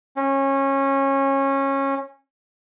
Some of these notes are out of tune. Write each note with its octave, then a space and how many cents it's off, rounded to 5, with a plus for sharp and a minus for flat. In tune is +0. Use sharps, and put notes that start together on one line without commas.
C#4 -20